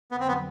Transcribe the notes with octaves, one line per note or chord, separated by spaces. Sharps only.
F2 D3 F#3 B3
C4
B3